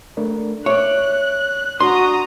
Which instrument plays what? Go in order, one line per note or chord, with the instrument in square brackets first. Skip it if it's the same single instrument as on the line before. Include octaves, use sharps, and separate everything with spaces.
[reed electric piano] A3 D4 A#4
[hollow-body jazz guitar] C#5 D5 [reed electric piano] E5 [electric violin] F#6
[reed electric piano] D4 [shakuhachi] F#4 [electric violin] A#5 D#6 [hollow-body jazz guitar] C6